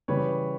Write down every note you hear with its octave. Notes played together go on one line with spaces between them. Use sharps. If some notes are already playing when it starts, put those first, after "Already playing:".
C#3 E3 G3 B4 C#5